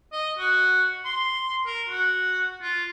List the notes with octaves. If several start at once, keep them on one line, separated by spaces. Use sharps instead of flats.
D#5
F#4
C6
A#4
F#4
F4